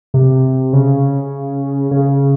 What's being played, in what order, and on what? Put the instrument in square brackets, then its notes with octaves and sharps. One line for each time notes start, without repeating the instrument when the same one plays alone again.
[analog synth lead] C3
C#3
C#3